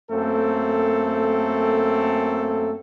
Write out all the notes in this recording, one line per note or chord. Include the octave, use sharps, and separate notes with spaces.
F#2 A3 A#3 C4 A4